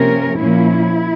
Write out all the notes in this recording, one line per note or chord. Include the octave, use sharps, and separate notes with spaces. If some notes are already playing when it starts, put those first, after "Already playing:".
Already playing: C3 F3 A#3 C#4 A#4
A#2 F3 A#3 C#4 E4